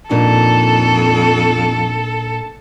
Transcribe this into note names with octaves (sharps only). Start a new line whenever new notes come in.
F2 A#2 D4 D#4 A4